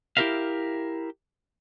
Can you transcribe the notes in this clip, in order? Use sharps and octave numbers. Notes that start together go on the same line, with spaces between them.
E4 G4 A4 A#4 E5 F5